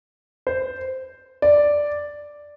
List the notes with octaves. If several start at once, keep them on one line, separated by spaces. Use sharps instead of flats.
C5
D5